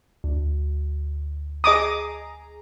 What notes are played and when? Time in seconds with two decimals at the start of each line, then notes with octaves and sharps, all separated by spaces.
0.24 D2
1.64 G#4 D#5 A#5 D6 D#6